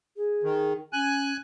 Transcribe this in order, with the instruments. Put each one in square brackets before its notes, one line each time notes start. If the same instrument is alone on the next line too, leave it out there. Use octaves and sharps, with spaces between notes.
[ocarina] G#4
[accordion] D#3
[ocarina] C#4 [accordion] G#5 F#6